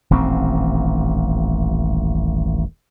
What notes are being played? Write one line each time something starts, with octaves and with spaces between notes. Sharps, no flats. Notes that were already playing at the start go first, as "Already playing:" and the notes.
D#1 A1 D#2 C4